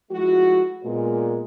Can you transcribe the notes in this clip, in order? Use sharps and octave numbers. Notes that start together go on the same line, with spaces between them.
F3 G#3 A3 E4 F#4
A#2 G#3 B3